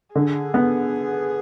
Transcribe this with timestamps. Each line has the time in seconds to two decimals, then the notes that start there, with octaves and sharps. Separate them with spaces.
0.15 D3 G#4
0.54 B3